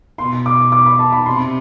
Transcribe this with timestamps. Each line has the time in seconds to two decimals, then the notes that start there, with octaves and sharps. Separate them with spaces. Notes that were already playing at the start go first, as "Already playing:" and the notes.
0.18 B2 C6
0.46 D6
0.72 D6
0.86 B5
0.99 A5
1.12 B5
1.26 C3 C6